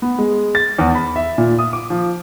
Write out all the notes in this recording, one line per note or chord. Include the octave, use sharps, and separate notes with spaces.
B3
G#3
A6
E2
B5
E5
A#2
D#6
D6
F3